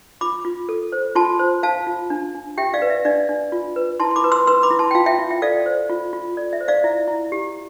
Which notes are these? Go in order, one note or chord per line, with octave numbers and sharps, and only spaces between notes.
F4 B5 D6
F4
A4
C5
F4 A5 C6
C5
C5 F5 A5
F4
D4
D4
G4 E5 G5
D5 F5
B4
E5
D4 D5 F5
D4
F4
B4
E4 A5 C6
C6
B5 D6
B4
C6 E6
B4 C6 E6
B5 D6
E4
A5 C6
G5
F4 F5 A5
E5 G5
F4
E5 G5
A4 D5 F5
C5
F4
F4
A4 D5
E5
C5
D5 F5
E4 E5
E4
G4